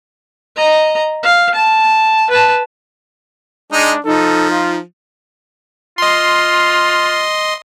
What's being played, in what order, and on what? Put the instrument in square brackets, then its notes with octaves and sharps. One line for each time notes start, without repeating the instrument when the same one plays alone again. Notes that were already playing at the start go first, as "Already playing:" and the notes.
[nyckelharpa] D#5 A#5
F5
A5
B4 A5
[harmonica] G#3 D#4 [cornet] D4
[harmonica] F3 [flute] D#4 [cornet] A4
[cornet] F4
[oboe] F4 [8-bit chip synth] D#5 C6